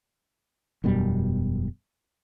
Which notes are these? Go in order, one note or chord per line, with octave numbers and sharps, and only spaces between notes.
E1 F#2 B2 G3